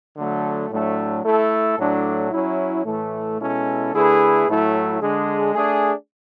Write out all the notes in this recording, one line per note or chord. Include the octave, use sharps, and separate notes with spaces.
D3 F#3 A3
A2 F#3 A3 D4
A3 E4 A4
A2 F#3 A3 D4
F#3 C#4 E4
A2 E3 A3
B2 G#3 C#4 E4 A4
D3 A3 E4 G#4 B4
A2 F#3 A3 E4
D3 G#3 D4 G#4
A3 D4 G#4